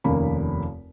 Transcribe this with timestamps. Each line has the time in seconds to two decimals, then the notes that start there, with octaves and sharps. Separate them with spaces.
0.04 F1 D#2 A#3 C#4 B5